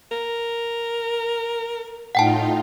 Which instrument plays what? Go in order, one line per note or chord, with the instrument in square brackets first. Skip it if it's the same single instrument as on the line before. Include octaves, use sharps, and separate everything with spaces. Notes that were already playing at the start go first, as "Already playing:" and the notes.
[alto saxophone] A#4
[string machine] A2 D#4 F4 [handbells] F#5 G5 A5